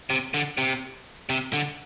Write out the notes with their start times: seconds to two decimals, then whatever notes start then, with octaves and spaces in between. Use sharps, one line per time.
0.10 C3
0.34 D3
0.58 C3
1.29 C3
1.53 D3